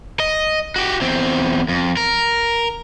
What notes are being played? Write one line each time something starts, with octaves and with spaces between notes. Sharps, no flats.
D#5
F#4 G4
E2 C4
F2
A#4